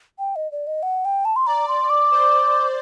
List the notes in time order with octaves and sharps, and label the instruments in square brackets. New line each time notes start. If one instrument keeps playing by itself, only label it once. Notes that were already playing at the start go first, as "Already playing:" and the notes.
[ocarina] G5
D#5
D5
D#5
F#5
G5
A5
C6
[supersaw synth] D5 [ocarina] A#5
[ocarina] C6
D6
[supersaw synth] C5